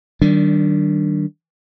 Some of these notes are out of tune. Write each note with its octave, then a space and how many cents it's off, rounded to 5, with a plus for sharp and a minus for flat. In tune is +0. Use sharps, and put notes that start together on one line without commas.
D#3 +0 G3 -25 D4 +0